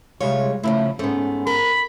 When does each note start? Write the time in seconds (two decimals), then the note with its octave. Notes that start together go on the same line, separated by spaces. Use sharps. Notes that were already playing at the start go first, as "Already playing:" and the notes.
0.21 C3 G3 G#3 F4 C#5
0.63 A#2 C#3 F3 A3 E4
0.99 G#2 A3 B3 C#4
1.47 A#4 B5